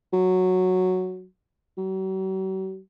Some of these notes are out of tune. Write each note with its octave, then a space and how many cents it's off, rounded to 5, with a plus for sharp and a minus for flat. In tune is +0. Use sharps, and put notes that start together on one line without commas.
F#3 -5
F#3 +45